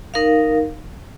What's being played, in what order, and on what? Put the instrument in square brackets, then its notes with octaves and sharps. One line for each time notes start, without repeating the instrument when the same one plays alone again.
[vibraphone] D#4 A#4 F5